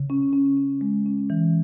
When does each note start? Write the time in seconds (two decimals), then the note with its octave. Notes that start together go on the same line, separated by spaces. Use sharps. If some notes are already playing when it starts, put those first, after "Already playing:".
Already playing: C#3
0.10 C#4
0.33 C#4
0.57 C#4
0.81 G#3
1.06 C#4
1.30 E3